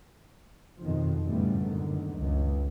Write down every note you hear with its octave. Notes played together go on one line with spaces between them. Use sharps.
F2 B2 D#3 F3
F#2 A2 C#3 G3 A3 B3
F#1 F#2 D3 D#3
C#2